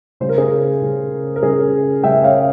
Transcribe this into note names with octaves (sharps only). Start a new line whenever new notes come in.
C#3 G3 C#4 C5
A#4
G#4 C5
C#3 G3 C#4
A#4
C#3 G3 C#4 G#4
C#3 G3 C#4 E5 G5
E5
C#5 F5